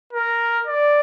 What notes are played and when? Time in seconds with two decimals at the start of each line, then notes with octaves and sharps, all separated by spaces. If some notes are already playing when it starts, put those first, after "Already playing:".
0.13 A#4
0.67 D5